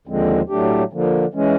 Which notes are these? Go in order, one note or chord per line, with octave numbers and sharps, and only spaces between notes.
D#2 D3 F3 G#3 C4
A2 F#3 A3 D4 G4
D3 F3 A#3
E3 G#3 C#4